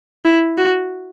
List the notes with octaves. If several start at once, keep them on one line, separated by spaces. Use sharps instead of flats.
E4
F#4